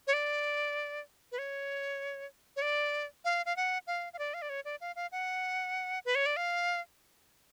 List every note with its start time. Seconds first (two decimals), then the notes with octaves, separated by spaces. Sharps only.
0.07 C#5
0.13 D5
1.32 B4
1.38 C#5
2.56 C#5
2.62 D5
3.25 F5
3.46 F5
3.56 F#5
3.87 F5
4.13 F5
4.19 D5
4.34 F5
4.42 D5
4.50 C#5
4.65 D5
4.81 F5
4.96 F5
5.12 F#5
6.05 B4
6.15 C#5
6.26 D5
6.37 F5